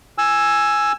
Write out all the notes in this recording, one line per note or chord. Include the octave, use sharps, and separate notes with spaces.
G#5 E6